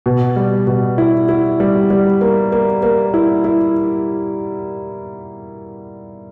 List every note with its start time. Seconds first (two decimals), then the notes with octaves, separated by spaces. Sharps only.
0.06 B2
0.36 G3
0.67 B2
0.98 E4
1.29 E4
1.60 G3
1.90 G3
2.21 A#3
2.52 A#3
2.83 A#3
3.14 E4
3.44 E4